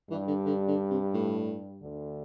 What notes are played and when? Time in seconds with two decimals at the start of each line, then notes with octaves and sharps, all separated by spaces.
0.11 G2 E3 G3
0.27 D3
0.45 D3
0.68 D3
0.90 C3
1.14 A2
1.81 D2 D3